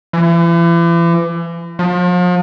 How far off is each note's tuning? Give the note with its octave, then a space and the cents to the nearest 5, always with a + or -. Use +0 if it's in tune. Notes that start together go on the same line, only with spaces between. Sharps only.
E3 +40
F3 +40